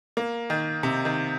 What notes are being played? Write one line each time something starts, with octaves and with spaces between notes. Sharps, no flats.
A#3
D#3
C3
D#3